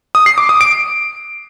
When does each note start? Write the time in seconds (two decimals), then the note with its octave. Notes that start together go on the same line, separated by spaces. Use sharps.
0.15 D#6
0.26 C7
0.38 D6
0.49 D#6
0.61 D7